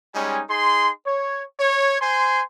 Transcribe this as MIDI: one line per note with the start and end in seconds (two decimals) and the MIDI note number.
0.15 0.42 55
0.15 0.42 56
0.15 0.42 61
0.15 0.42 63
0.15 0.42 80
0.50 0.92 63
0.50 0.92 68
0.50 0.92 84
1.07 1.44 73
1.60 2.00 73
2.02 2.42 72
2.02 2.42 80
2.02 2.42 84